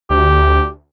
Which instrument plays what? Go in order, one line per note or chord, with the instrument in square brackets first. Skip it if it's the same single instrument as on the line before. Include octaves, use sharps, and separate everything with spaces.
[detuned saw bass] D2 [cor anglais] G4